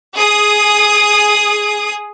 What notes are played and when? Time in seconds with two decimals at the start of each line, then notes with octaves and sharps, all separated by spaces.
0.16 G#4 D#6